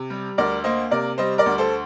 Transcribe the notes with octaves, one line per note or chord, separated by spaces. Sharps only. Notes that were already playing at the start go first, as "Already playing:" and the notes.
Already playing: C3
G3
D2 A#4 D5
A#3 C5 D#5
C3 A#4 D5
G3 C5 D#5
A#4 D5
D2
A4 C5